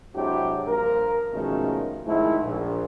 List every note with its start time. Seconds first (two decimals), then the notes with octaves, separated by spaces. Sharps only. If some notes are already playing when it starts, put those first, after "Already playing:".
0.15 C3 F#3 G#3 D4 E4 G4
0.67 G2 F3 A#3 A#4
1.33 B2 D#3 F3 G#3 A3 C#4
2.06 F2 G#2 D#3 G#3 A3 E4
2.42 A#1